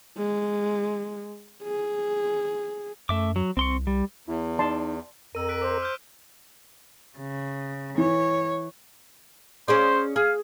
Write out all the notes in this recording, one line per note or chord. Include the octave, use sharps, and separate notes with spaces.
G#3
G#4
F#2 A3 E5 D6
F#3
C2 C4 C6 C#6
G3
E2 E4
D#4 D5 A5 C6
F2 A#4 E6 D#7
F#6 B6 D7
C5 D6
F6 G6
C#3
E3 C#5
C#4 G#4 C5 D5
G#4 F5